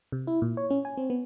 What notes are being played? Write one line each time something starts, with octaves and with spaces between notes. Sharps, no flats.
C3
E4
A#2
C#5
C#4
G#5
C4
B3